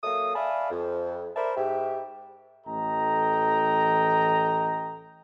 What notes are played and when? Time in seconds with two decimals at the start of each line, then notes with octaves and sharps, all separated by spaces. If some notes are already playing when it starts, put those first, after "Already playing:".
0.04 F#3 A#3 A4 E5 D#6
0.36 D5 E5 F5 G#5 A5 B5
0.71 F2
1.36 A#4 C5 D5 E5 A5 B5
1.57 G#2 G4 E5
2.67 A1 E3 A4 D#5 G5 A#5